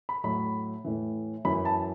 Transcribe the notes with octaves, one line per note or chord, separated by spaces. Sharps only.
B5
A2 F#3 B5
A2 E3
F#2 E3 B5
A5